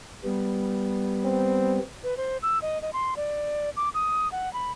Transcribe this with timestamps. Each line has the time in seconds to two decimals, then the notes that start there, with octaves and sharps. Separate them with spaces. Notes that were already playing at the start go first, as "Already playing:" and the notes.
0.24 G3 B3
1.25 C4
2.04 B4
2.17 C5
2.43 E6
2.62 D#5
2.82 D#5
2.93 C6
3.17 D5
3.76 D6
3.94 D#6
4.32 F#5
4.53 B5